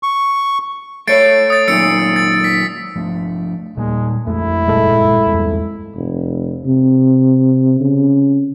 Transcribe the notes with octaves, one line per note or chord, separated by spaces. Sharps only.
C#6
A3 C#5 A6 C7 D7
D#6 A6
F#2 A#2 D#3 E6 C#7 D7
A6
B6
F3 A3 D4
A#2 G3 G#3 A#3
F2 G#3 A3 E4
F#1 G2 A#2 G#3 A4
E2 G2 B3
F1
C3
C#3